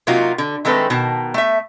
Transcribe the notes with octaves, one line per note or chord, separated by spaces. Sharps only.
C3 F#3 A#3 D#4 F4 F#4
D3
D#3 G#3 A3 C4 A4 B4
B2 D#3 A5
A3 E5